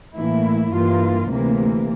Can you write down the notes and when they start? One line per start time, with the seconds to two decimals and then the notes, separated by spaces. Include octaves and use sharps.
0.15 A2 E3 A#3 E4
0.73 G2 E3 A#3 F4
1.30 D2 C3 E3 A#3